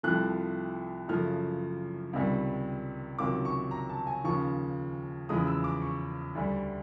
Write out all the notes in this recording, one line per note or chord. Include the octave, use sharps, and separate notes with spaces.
C2 C3 F3 A3 F#6
F#2 C#3 F3 A3 F6
C#2 C3 D#3 G3
C#2 C3 D#3 F#3 D6
C#6
A#5
A5
G#5
D#2 C#3 F3 C#6
E2 C#3 F3 G#3 D#6
E6
D6
C#6
D2 D3 G3